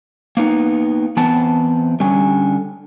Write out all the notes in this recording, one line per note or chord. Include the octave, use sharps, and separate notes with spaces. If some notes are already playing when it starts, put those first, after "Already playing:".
A#3 B3 D#4
E3 B3 C4 A5
D3 G3 C#4 G#5